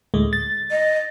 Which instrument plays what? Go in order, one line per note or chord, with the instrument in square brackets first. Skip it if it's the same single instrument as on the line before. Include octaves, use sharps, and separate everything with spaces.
[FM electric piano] D2 A2 G#3
A6
[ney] D#5